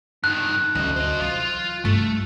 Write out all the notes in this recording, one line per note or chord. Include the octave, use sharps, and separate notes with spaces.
G2 D#3 F#6
D2 C#3 F#3 D#5
C5 D#5
E3 F#3 F4
G2 A3 F4